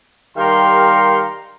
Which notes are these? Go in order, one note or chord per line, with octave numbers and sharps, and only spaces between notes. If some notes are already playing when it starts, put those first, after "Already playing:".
D#3 G3 G4 A#4 F5 C6